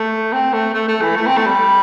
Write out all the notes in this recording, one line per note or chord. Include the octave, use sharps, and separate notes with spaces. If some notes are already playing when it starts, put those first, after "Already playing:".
Already playing: A3
C4
A3
A3
A3
E3
A3
C4
A3
G3